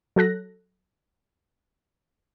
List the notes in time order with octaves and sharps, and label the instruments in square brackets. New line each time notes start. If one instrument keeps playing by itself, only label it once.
[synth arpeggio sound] F#3 A4 F#6 A#6